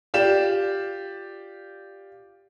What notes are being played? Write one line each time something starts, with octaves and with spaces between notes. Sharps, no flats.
F4 G4 D5 E7